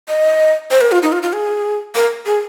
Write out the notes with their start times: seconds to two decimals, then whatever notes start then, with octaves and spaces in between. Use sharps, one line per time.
0.08 D#5
0.71 C5
0.81 A#4
0.92 F4
1.03 D#4
1.12 F4
1.23 F4
1.33 G#4
1.96 A#4
2.26 G#4